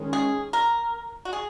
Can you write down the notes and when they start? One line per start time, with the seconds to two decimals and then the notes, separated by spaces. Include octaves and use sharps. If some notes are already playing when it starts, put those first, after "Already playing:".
Already playing: D#3 G#3 C#4
0.13 G#4
0.53 A#4
1.25 F#4
1.33 G#4